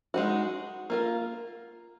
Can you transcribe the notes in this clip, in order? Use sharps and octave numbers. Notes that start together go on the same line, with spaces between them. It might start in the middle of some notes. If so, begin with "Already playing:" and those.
G#3 D#4 F#4
A#3 F4 A#4